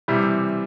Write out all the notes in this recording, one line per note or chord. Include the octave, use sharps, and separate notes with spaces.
C3 E3 G3